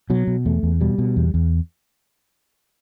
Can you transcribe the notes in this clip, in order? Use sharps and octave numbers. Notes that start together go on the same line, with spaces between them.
B2 F#3
B2
E2 A3
E2
B2 G3
B2
E2
E2